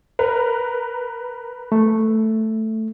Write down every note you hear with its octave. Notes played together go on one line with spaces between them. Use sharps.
A#4 B4
A3